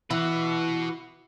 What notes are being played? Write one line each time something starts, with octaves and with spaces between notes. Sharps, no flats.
E3 F#4 B4